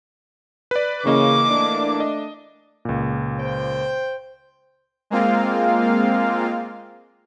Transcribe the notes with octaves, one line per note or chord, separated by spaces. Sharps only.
B4 D5
C#3 E3 A#3 D#5 D6
A3 D4
D#5
C#2 A#2
C5 G5
G#3 A#3 C4 F4 F5